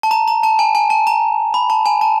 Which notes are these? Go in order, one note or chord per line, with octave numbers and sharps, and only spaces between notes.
A5
A#5
A#5
A5
G#5
G#5
A5
A#5
B5
A5
G#5
A5